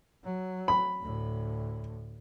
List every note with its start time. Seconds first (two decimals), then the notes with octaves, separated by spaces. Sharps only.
0.24 F#3
0.68 B5
1.01 D2 A2